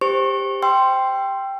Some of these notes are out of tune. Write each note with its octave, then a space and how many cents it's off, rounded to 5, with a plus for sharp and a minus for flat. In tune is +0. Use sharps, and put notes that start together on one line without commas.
G4 +15 C5 +0 C#6 -30
G5 +0 C6 +0 E6 +35